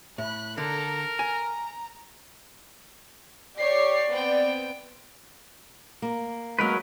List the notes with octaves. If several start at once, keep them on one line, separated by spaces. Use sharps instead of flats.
A2 B5 F#6
D3 A4 A#4 A#5
G#5 A#5
G4 C#5 D5 C7
B3 C4 G5
A#3
F#3 G#3 A#3 C#4 A#4 B4